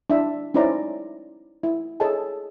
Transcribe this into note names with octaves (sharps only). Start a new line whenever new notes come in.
D4 E4 E5
C#4 D#4 E4 C5 D5 A#5
E4
G#4 A4 C#5 D#5 G#5 A5